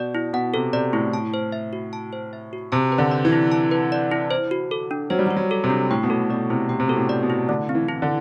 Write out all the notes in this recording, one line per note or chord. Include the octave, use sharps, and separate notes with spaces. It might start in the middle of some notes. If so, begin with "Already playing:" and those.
Already playing: B2 D5
E4
B2 F#5
C3 A4
C3 D5
A2 E4
A5
C5
E5
F#4
A5
C5
E5
F#4
C3 A5
B4
D3
D5
E3
E4
A5
B4
D5
E4
C5
F#4
A4
D4
F#3 C5
G3
F#3
F#4
F#3
A4
C3
D4
A2 G5
B2
A2 A4
B2 D5
C3 E4
C3 G5
C3
B2 A4
A2
D5
B2
E4
D3 A3
C4
E3
E4
D3